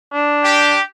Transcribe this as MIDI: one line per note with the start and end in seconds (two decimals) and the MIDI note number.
0.13 0.76 62
0.43 0.80 67